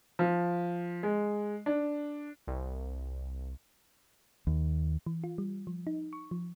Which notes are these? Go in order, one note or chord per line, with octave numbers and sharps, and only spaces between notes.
F3
G#3
D4
C2
D#2
E3
F4
G3
F3
D#4
C#6
F3